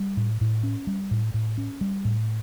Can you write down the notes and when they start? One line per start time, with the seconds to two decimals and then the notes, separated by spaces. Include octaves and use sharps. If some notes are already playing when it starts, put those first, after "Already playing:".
Already playing: G3
0.17 A2
0.41 A2
0.63 C#4
0.87 G3
1.11 A2
1.34 A2
1.58 C#4
1.81 G3
2.05 A2